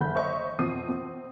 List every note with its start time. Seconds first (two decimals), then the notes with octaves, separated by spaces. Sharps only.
0.01 F#1 D3 B5 G6
0.15 C5 C#5 D#5 E5 C#6
0.59 F2 B2 C4 D#6 C7 D#7
0.89 C4